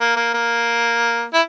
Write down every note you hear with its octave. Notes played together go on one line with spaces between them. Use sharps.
A#3
A#3
A#3
E4